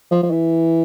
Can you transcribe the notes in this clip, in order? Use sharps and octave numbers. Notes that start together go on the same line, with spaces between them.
F3
F3
E3